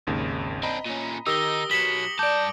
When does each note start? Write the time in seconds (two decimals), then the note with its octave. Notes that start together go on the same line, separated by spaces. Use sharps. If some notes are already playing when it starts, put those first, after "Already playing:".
0.07 G#1 D#2 C#3
0.63 C4 D4 D#5 A#5 B5
0.86 A#2 C#4
1.27 D#3 D#4 G4 A#4 D#6 E6 A#6 G7
1.71 B2 F#3 B6 C#7 E7 F#7
2.19 G2 D5 A5 D6 G6 D7